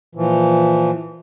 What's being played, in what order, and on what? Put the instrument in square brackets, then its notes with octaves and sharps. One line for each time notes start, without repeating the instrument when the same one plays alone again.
[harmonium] A#2 E3 F3